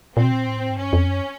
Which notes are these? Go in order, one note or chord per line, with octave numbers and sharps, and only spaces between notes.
A#2 C4
B2
A#2
A2
G#2
G2 C#4
F2
F#2